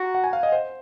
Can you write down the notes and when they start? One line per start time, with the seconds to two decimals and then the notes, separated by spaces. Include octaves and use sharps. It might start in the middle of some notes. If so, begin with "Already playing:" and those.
Already playing: F#4 A#5
0.15 F#5
0.24 G#5
0.33 F5
0.43 D#5
0.52 C5